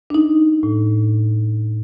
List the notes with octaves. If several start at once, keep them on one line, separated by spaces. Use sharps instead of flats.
D4 D#4
A2